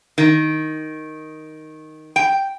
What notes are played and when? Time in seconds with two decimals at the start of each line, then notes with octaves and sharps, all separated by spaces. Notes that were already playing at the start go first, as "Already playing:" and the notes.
0.18 D#3
2.16 G5